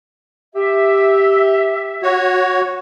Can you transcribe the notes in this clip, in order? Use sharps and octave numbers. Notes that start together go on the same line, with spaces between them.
G4 E5
F#4 C#5